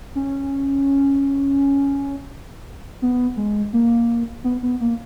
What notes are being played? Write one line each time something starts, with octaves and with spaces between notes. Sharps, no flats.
C#4
B3
G#3
A#3
B3
B3
A#3